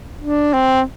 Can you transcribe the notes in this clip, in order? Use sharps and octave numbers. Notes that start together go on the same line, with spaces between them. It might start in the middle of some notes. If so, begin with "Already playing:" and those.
D4
C4